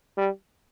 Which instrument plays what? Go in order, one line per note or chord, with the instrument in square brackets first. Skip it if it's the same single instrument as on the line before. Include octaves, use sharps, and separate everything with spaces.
[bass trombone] G3